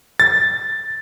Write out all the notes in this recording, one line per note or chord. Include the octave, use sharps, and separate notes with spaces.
A6